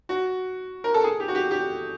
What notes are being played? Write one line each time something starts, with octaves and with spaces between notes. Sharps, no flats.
F#4
A#4
A4
G#4
G4
F#4
G4
G4